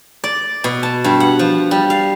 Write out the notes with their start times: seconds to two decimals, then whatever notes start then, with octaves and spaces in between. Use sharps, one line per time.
0.24 D5
0.64 B2
0.83 A5
1.04 G2
1.20 F#5
1.39 F3
1.71 G3
1.90 F5